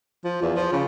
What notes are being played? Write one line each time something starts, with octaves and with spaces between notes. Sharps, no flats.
F3
E2
F3
C#3